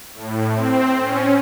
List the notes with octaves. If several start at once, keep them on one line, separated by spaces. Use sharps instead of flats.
A2
C4
C#4